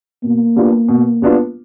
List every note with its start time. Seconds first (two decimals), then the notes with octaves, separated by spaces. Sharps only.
0.23 B2 A#3
0.56 G3 B3 D4 F4
0.88 B2
1.22 G3 B3 D4 F4